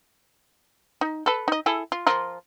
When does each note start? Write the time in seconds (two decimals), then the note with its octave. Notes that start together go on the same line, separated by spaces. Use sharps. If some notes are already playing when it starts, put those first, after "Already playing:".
1.01 D#4
1.26 A4 B4
1.48 D#4 D#5
1.66 E4 G#4 A4
1.92 F4
2.07 F3 F4 A#4